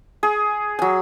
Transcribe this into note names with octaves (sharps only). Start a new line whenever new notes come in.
G#4
F#3 G#5